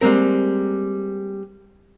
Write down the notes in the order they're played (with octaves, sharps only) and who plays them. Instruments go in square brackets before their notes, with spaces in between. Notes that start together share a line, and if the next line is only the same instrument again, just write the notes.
[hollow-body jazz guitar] G3 G#3 A#3 C4 A#4